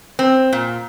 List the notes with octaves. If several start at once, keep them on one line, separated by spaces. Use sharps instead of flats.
C4
A#2